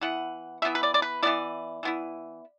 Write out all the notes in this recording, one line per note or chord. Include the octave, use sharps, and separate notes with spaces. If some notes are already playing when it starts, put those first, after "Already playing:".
E3 B3 E4 F#5
E3 B3 E4 E5
B4
D5
D5
B4
E3 B3 E4 D5
E3 B3 E4